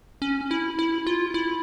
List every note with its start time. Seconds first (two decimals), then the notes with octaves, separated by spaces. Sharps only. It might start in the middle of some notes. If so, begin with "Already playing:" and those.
0.22 C#4
0.51 E4
0.79 E4
1.07 F4
1.34 E4